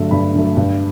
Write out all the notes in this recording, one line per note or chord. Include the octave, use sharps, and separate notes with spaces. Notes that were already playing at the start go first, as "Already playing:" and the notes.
Already playing: G2 D3 F#3 A3
G2 B5
D3 F#3 A3
G2